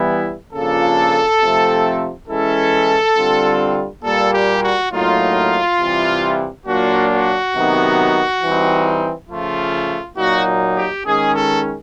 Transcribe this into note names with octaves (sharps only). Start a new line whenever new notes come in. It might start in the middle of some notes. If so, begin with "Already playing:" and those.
Already playing: E3 G3 B3 E4
C#3 F3 A#3 D4 F4 A4
C3 F3 A3 C4
E3 G#3 C#4 E4 A4
D3 G3 C4 F4
A#2 G3 A#3 A4
G4
F#4
A2 F#3 A#3 D#4 F4
C3 E3 G3
A#2 F#3 A#3 D4 F4 F#4
F#4
C3 D#3 F#3 B3 D#4
E3 G3 C4 D#4
C#3 F3 A3 F4
A#2 F#3 A#3 D#4 F#4
G4
D#3 G#3 C#4 G#4
A4